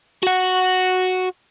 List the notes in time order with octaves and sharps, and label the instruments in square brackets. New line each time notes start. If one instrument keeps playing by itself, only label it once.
[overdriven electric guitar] F#4 F#5